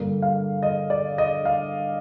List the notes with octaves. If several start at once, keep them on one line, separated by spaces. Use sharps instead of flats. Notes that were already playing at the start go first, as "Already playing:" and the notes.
Already playing: G2 D3 G3 A#3
F5
D#5
D5
D#5
F5